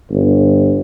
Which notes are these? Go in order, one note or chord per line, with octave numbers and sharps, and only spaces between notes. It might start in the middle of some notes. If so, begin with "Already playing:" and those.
G1